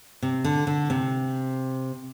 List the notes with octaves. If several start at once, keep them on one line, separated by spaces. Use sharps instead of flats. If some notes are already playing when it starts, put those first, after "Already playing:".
C3
D3
D3
C3